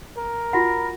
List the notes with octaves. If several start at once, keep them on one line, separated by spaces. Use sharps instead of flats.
A#4
F4 F#4 F#5 B5 A#6